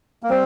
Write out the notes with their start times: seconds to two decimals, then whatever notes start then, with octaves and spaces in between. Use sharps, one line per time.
0.23 A#3
0.29 G3 C4 C5